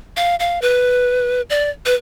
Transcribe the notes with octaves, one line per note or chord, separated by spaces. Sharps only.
F5
F5
B4
D5
B4